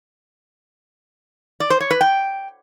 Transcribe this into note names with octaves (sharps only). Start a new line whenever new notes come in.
D5
C5
C#5
B4
G5